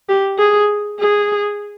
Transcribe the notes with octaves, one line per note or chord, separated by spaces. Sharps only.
G4
G#4
G#4